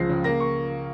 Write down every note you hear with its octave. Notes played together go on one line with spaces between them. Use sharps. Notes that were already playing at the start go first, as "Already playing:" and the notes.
Already playing: C#2 F3 G#3 A#6 C7
C#3
A#3 A#6
C#6